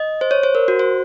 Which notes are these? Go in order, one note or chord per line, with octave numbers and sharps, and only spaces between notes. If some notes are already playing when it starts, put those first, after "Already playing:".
Already playing: D#5
C5
C#5
C5
A#4
F#4
C5